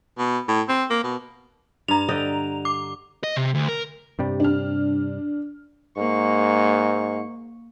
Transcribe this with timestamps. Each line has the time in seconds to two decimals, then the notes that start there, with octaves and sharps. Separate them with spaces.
0.18 B2
0.48 A2
0.69 C4
0.90 A#3
1.04 B2
1.88 G2 A#5 F7
2.09 D3 D#5 G5
2.65 D6
3.24 D#5
3.36 C3
3.55 D2
3.69 A#4
4.19 G2 C3 G3
4.40 D4 F6
5.98 G#2 A#3 C#6